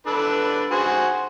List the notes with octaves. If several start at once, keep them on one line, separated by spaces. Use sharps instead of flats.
D4 A4 B4
F#4 G#4 C5